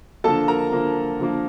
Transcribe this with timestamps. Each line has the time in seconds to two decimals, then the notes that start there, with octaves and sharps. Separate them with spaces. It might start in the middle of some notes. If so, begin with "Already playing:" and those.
0.24 D3 F3 A#3 A4 A5
0.48 A#4 A#5
0.72 D3 F3 A#3
1.20 D3 F3 A#3